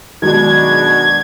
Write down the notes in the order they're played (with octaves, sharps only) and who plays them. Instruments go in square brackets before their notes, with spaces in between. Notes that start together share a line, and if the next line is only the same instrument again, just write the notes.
[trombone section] B2 D4 F#4 [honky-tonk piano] D#3 F#3 G#3 [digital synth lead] G#6